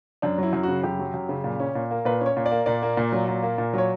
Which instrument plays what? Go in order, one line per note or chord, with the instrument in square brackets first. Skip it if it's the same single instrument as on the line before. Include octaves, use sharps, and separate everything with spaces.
[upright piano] F#2 D4
F#3 E4
F#2
C#3 F#4
F#2 G4
F#3
F#2
C#3
A#2
C#4
A#2
A#3
A#2 B4
C#4 C#5
A#2
D5
A#3
A#2 D5
A#3
A#2
F#3
A#2
A#3
A#2
F#3 C#5